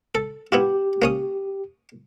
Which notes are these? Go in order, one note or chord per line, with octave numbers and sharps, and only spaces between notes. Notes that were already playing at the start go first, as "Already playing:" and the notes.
A4
B3 E4 F4 G4
A#3 C#4 D#6